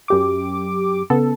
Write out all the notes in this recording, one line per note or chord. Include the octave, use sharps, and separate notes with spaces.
F#2 G4 D6
C#3 B3 A4